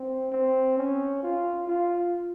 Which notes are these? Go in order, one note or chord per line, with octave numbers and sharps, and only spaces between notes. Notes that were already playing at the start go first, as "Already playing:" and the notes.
Already playing: C4
C4
C#4
F4
F4